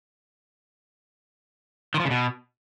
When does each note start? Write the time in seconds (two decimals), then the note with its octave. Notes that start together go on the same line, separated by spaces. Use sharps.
1.94 D#3
2.00 F3
2.05 C#3
2.11 B2